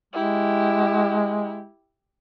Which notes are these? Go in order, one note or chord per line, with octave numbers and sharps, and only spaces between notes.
G#3 E4 G4